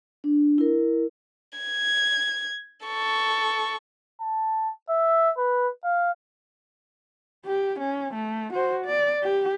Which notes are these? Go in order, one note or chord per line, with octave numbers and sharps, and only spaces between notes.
D4
E4 A#4
G#6
A4 C#6
A5
E5
B4
F5
G4
C#4
A3
F#4 C5
D5
G4